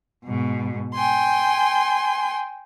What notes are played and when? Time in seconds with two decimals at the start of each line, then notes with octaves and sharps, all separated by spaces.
0.25 G#2 B2
0.94 G5 G#5 C6